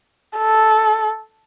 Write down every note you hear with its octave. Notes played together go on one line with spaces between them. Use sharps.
A4